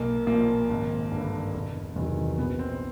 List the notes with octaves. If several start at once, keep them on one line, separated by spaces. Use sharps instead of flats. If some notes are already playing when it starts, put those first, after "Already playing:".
Already playing: B1 A#3
A#2 F3 A#3
G#1
G2 D3
E1
E2 C3 D#3 F#3
A#1 B3
C4